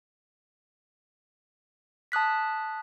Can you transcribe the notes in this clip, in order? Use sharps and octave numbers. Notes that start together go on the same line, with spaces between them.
A5 D#6 F#6 B6